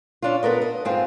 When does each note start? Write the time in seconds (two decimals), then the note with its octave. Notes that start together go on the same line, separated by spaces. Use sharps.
0.22 C#4 D4 F4
0.43 B3 A4 A#4 D#5
0.62 D#5
0.85 G#2 C4 F4